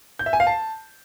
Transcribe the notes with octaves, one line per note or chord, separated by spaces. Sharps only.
G6
E5
G#5
F5
A5